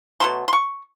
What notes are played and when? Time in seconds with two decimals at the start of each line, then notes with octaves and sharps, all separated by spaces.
0.20 B2 F#3 A3 C6
0.48 C6
0.53 C#6